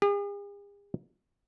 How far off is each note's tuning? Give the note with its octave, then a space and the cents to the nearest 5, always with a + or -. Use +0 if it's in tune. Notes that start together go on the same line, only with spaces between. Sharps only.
G#4 -45